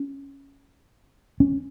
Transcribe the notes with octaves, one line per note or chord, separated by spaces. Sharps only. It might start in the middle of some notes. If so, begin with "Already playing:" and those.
Already playing: C#4
C#4